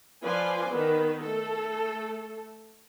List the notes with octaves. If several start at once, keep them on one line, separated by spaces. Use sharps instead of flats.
F3 F4 B4 D5 G#5 C6
D#3 B3 B4
A3 A4